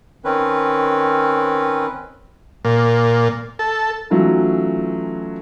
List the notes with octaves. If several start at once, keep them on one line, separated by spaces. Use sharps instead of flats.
D#3 C4 C#4 B4
A#2
A4
E3 F#3 A3 C#4 D#4 F4